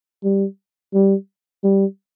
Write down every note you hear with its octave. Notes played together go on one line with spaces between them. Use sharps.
G3
G3
G3